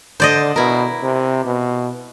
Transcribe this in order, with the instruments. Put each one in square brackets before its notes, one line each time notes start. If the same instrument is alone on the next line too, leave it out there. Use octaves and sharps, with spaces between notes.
[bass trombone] D3 [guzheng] C5 D5 D#5
[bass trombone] B2 [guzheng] E4 A#4
[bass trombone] C3
B2